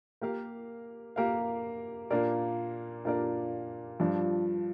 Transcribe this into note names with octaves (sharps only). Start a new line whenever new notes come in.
A#3 G4 A#4 F5
A#3 G4 A#4 F5
A#2 A#3 D4 A#4 D5
A#2 A#3 D4 A#4 D5
G2 F3 D4